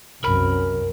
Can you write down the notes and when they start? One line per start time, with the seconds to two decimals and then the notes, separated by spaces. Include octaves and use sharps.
0.24 C2 F#2 A#4 B5